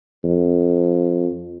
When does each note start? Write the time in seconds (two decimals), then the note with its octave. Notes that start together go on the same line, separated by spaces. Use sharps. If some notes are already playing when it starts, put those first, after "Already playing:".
0.24 F2